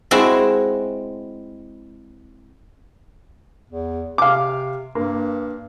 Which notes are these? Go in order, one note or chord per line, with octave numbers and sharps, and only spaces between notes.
G#3 C4 E4 F#4
E2
C3 F5 D6
G2 A#3